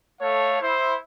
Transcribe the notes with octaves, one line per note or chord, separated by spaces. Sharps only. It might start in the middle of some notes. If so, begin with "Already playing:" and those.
A3 A4 C#5 F5
E4 C5